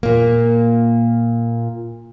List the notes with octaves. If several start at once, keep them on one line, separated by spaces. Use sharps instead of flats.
A#2 A#3